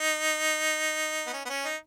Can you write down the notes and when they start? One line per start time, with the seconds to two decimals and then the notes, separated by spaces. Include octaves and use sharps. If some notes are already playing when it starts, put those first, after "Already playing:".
Already playing: D#4
1.27 B3
1.34 C#4
1.46 B3
1.50 C#4
1.64 D#4